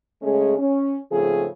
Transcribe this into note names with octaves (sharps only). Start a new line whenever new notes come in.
C#3 G#3 A3 C#4 G#4
C#4
G#2 C#3 F3 A3 C4 G#4